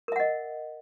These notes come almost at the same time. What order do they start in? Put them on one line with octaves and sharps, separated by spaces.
A#4 E5 F#5 D#5